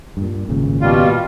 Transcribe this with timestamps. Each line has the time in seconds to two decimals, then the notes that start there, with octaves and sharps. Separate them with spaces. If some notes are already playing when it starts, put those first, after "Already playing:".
0.17 G2 A#2
0.49 G#1 A#2 C#3
0.81 B2 G3 F4
1.04 A#2